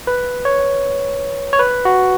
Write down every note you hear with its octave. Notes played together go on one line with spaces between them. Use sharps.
B4
C#5
C#5
B4
F#4